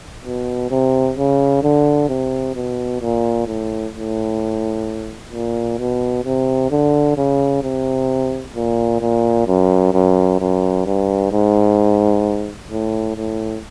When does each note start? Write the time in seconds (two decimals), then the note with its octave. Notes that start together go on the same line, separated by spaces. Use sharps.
0.25 B2
0.71 C3
1.17 C#3
1.63 D3
2.09 C3
2.55 B2
3.01 A#2
3.47 A2
3.94 A2
5.33 A#2
5.79 B2
6.25 C3
6.71 D3
7.17 C#3
7.63 C3
8.56 A#2
9.01 A#2
9.48 F#2
9.94 F#2
10.40 F#2
10.86 G2
11.32 G#2
12.71 A2
13.17 A2